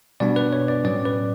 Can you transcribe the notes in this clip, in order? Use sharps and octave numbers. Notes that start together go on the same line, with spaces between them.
B2 G3 B3 D4 D5
B4
C#5
D5
A2 F#3 C#4 D5
B4